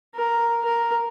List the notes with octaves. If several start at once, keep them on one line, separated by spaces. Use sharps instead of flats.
A#4
A#4